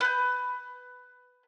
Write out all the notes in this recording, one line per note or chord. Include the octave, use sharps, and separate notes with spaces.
B4 G6